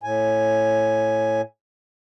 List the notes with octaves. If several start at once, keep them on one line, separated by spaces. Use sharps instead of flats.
A2 G#5